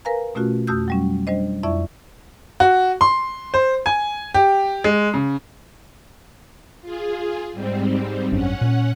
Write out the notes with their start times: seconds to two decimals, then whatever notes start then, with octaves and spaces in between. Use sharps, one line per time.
0.05 A#4 B4 F5 G#5 A#5
0.35 B2 A3 C#4 F4 F#4
0.67 F2 A3 F#4 D#6 E6 G6
0.88 F#3 G3 C#4
1.27 G3 D4 C5 D#5
1.63 F2 E4 D5 E5 C#6
2.60 F#4
3.01 C6
3.54 C5
3.86 G#5
4.34 G4
4.84 G#3
5.14 C#3
6.81 F4 G#4
7.53 G#2 G3 C4
8.32 G#1 F#2 C#4 D4 F#5
8.61 A#2